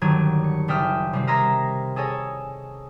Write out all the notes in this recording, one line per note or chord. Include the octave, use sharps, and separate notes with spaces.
G1 D#3 F#3 D4 G#6 D#7
C#7
F#1 D4 E5 G5 D#6 F6
C3 G3 C4
A#4 D#5 E5 A#5 C6 G#6
G#4 A4 C#5 D#5 G#5